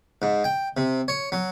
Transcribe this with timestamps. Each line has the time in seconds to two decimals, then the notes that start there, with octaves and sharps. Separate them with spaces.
0.22 G#2
0.44 G5
0.77 C3
1.08 C#5
1.32 F#3